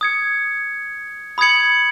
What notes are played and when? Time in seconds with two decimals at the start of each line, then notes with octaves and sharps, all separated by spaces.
0.01 D#6 G#6 C#7
1.38 B5 D#6 G#6 C#7 F#7